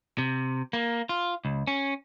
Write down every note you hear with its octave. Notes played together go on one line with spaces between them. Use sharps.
C3
A#3
F4
C#2
C#4